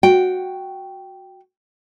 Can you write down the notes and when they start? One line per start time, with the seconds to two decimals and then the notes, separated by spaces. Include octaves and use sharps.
0.03 F#4 G5